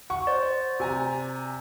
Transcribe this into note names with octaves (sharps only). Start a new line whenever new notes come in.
F#5 C#6
C5 D5
C3 G#5 A#5